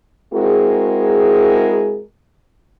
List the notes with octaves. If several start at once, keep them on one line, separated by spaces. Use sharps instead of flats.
G#3 C4 E4 F#4 G#4 A#4